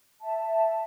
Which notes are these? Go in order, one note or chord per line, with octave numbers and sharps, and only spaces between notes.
E5 A5